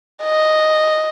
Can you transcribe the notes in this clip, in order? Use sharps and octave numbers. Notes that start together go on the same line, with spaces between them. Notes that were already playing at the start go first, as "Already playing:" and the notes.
D#5